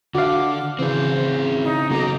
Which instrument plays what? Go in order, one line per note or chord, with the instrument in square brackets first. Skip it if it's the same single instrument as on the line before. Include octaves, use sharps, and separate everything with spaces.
[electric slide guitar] D3 [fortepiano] F#4 F5 [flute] D6
[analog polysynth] C#3 E3 [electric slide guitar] C4 G#4 [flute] C5
[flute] D#4
[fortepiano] B1 [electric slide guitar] C#3 A#3 [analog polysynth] A#5 D6